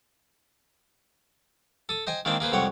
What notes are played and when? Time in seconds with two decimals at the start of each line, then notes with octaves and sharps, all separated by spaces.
1.89 A4 D#6
2.07 C5 D#5 G5 G#5
2.25 D#3 G#3 A#3 C4 D4
2.40 A#3 G#4 B4 C5
2.52 C2 F2 G#3 C#5 F#5 G5